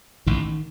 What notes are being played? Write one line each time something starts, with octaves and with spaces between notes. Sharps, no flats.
A1 A2 D#3